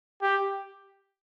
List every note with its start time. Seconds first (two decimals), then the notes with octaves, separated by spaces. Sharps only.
0.22 G4